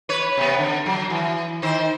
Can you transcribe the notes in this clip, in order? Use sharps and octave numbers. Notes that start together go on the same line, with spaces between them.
B4 C#5
C3 B3
D3
F#3
E3
D#3 C5